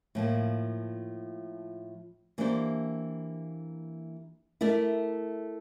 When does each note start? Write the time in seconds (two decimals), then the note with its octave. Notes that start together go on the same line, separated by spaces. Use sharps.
0.15 A2 F3 A#3
2.38 E3 A#3 D4 G4 C5
4.61 A3 E4 A#4 D5